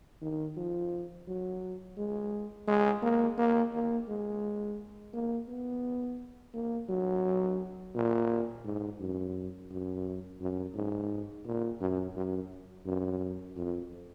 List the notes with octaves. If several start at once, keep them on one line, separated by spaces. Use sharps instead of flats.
D#3
F3
F#3
G#3
G#3
A#3
A#3
A#3
G#3
A#3
B3
A#3
F#3
A#2
G#2
F#2
F#2
F#2
G#2
A#2
F#2
F#2
F#2
F2